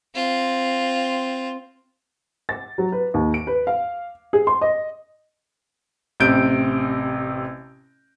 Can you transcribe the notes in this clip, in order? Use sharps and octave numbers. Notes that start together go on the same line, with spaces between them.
C4 F4
A6
F#3
B4
D#2
D7
B4
F5
G#4
C6
D#5
A1 C3 G6 D7